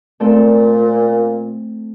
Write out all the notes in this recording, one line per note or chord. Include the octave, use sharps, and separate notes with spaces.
A#2 A3 C4 A4